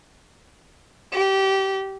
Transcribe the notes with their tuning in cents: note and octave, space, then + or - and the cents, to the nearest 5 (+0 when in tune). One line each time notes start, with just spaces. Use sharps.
G4 -20